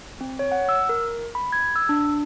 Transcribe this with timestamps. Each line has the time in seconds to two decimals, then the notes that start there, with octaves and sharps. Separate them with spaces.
0.21 C4
0.39 C#5
0.52 F#5
0.69 E6
0.89 A#4
1.35 B5
1.52 G#6
1.76 E6
1.89 D4